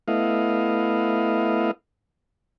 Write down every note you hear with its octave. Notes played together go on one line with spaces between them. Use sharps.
A3 B3 E4 D#5 F5